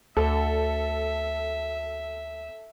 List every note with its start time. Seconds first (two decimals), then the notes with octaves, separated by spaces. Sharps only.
0.17 D2 A4 E5